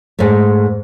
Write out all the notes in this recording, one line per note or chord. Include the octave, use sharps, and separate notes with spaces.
G#2 A3